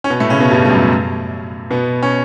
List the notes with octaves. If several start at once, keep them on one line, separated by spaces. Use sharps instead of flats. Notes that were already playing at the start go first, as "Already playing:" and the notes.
C#4
B2 B3
A2 A3
C#3 C#4
B2 B3
G2 G3
G3
F#2 F#3
B2 B3
C#4